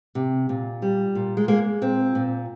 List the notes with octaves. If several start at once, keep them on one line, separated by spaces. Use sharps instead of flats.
C3
A#2
G3
A#2
G#3
G#3 A#3
A#2 C4
A#2